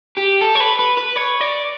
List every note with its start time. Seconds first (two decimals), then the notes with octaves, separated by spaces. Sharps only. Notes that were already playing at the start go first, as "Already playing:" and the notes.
0.17 G4
0.41 A4
0.55 C#5
0.60 B4
0.79 B4
0.97 B4
1.16 C#5
1.41 D5